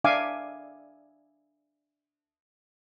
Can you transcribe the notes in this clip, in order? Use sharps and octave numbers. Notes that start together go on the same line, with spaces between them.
D4 D5 E5 F5 G#5 D6